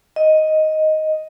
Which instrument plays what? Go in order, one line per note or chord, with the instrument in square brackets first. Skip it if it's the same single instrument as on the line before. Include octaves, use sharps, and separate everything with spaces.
[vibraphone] D#5